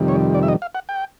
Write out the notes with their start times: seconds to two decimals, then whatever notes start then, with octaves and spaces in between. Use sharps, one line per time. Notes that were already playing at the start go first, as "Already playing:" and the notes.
Already playing: F2 C3 D#3 G3
0.08 C#5
0.34 D5
0.43 E5
0.48 D#5
0.62 F5
0.75 F#5
0.89 G5